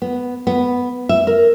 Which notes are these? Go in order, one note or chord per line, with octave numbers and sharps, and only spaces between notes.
B3
B3
E5
A#4